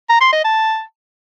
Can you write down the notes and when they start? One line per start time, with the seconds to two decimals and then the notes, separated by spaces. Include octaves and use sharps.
0.09 A#5
0.21 C6
0.33 D#5
0.44 A5